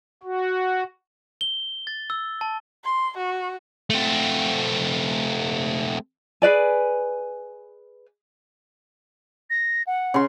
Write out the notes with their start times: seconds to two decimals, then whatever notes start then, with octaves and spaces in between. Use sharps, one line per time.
0.23 F#4
1.41 G7
1.87 A6
2.10 E6
2.41 A5
2.84 C6
3.17 F#4
3.90 A3 C4
6.42 G#4 B4 D5 G#5
9.50 A#6
9.87 F#5
10.14 C#3 C6